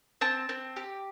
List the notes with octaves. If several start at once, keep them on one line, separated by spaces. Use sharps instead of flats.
C4 A5
C4
G4